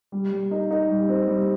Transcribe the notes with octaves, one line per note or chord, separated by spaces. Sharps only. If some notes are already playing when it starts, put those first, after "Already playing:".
G3
G3
D#4
D#4
G3
C4
G3